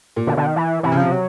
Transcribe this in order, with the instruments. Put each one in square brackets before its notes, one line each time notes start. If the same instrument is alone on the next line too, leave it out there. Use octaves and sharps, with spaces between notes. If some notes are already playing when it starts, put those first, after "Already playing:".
[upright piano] A#2
[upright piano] B2 [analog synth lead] D3
[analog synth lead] D3
D#3
E3
[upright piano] C3 [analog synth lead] E3
[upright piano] C#3
[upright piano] C3 [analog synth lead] F3
[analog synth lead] F#3